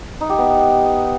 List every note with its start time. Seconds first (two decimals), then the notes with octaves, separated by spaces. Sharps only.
0.21 D#4
0.29 G4
0.38 B3